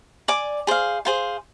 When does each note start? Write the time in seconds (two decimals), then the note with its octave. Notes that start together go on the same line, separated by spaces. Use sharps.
0.28 D5 G#5 D6
0.67 G#4 C5 F5
1.05 G#4 C5 F5